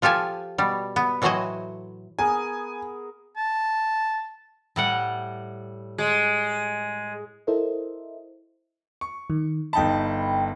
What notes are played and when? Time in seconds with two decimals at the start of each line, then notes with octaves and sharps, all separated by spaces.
0.02 F3 F4 G4 A4 G#5
0.58 B2 G3
0.96 B3
1.22 A2 E3 F#3 F#4 C5 D#5
2.19 B3 G#4 A#4 G#5
3.37 A5
4.76 A2 G3 F#5
5.98 G#3
7.47 E4 A4 A#4 C5 D#5 E5
9.01 C#6
9.30 D#3
9.73 G1 D#4 G5 A5 B5